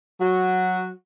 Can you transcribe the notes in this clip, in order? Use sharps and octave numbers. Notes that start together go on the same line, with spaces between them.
F#3 F#4